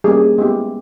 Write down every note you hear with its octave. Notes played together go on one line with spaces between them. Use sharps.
G3 A#3 C#4 G#4
G#3 B3 E4 G4